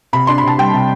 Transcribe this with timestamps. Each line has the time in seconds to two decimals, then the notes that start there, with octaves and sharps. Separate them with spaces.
0.13 C3 B5
0.27 D4 C6
0.38 B5
0.43 C3 A5
0.58 G3 G5
0.73 C3